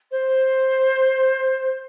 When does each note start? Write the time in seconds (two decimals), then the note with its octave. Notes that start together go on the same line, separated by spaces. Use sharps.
0.11 C5